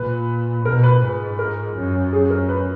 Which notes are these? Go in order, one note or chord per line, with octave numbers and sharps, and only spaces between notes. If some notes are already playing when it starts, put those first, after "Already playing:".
Already playing: A#2 B4
B2 A#4
B4
G#2 B4
A#4
F#2
G#4
A#4
B4